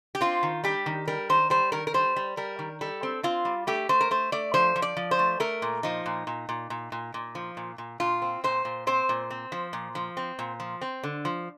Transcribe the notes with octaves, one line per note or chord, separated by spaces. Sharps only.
G4
C4 F4
D#3
G3 G4
D#3
G3 A#4
D#3 C5
G3 C5
D#3 A#4
A#4
G3 C5
G3
G3 A#4
D#3
G3 A4
C4
C4 F4
G3
A3 G4
A3 C5
A#4
A3 C5
A3 D5
F3 C5
F3
D5
F3
C5
A3
A3 A#4
A#2
F3 D#4
A#2
A#2
A#2
A#2
A#2
A#2
F3
A#2
A#2
A#2 F4
C4
A#2 C5
A#2
C4 C5
A#2
C4
F3
A#2
F3
C4
A#2
F3
C4
D3
F3